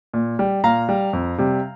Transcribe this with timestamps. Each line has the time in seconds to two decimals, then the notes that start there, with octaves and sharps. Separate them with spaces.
0.14 A#2
0.39 G3
0.64 A#2 F5 A#5
0.89 G3
1.13 F2
1.38 C3 G3